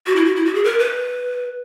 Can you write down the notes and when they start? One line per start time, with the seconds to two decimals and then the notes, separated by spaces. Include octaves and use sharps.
0.07 F#4
0.16 E4
0.25 F#4
0.36 E4
0.45 F#4
0.55 G#4
0.64 A#4
0.79 B4